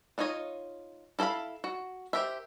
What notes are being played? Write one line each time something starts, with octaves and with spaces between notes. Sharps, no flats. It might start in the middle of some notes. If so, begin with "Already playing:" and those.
D4 D#4 F4 C#5 D#5
E4 A4 C5 F5 B5
F#4
G4 A#4 C5 E5